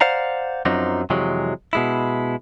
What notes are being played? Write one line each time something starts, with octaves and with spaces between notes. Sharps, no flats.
C5 D5 F5 F#5 A#5
F#2 F3 F#3 C4 D4 D#4
F2 C3 E3 F#3 G#3
B2 G#3 E4